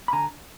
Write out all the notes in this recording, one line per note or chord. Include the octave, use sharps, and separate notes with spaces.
B5
D3 G#5 A#5